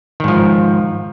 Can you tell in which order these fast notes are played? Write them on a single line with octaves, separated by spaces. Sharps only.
D#3 G#2 F3